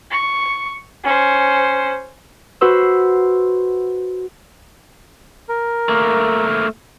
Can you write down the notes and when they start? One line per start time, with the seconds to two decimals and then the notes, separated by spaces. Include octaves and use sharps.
0.10 C#6
1.03 C#4 C5
2.61 F#4 B4 C5 C6 E6
5.49 A#4
5.89 A3 A#3